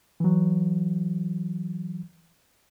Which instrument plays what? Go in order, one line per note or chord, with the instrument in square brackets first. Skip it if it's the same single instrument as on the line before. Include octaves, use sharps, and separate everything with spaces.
[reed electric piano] E3 F#3